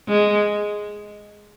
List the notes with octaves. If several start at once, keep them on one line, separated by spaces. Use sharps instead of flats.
G#3